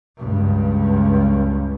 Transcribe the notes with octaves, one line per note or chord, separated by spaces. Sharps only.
C#2 G2